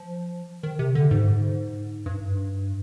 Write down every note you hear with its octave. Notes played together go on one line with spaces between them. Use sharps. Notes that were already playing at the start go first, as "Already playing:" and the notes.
Already playing: F3
D#3
C3
D3
G#2
G2